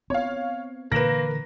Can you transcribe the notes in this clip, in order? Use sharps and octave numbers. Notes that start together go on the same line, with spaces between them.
B3 C4 C#5 F5
A#2 D3 E3 A#3 A#4 B4 A#6 E7